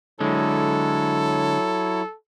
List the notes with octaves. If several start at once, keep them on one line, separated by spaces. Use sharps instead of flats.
D3 F#3 G#3 E4 A4 C#5